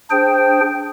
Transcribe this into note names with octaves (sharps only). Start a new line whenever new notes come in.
D4 G#4 C5 G5